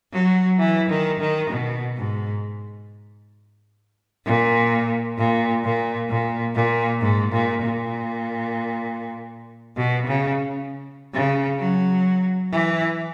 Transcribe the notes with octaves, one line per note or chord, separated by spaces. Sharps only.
F#3
E3
D#3
D#3
B2
G#2
A#2
A#2
A#2
A#2
A#2
G#2
A#2
A#2
B2
C#3
C#3
F#3
E3